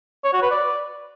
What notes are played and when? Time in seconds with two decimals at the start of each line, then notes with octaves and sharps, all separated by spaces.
0.24 C#5
0.33 F#4
0.42 B4
0.51 D5